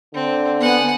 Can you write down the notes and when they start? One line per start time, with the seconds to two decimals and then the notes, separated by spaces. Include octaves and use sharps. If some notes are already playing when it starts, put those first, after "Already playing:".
0.14 D3 C4
0.60 B3 F#5 G#5